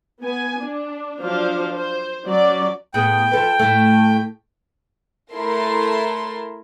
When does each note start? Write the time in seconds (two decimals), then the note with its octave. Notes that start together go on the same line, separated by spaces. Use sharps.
0.22 B3 G#5
0.62 D4
1.21 F3 F#3 D4 C5 F5
1.73 C5
2.26 F#3 C#4 D5
2.94 A2 B3 G#4 G5
3.31 F3 A4 B4
3.59 A2 A3
5.33 A3 E4 A4 A#4 C6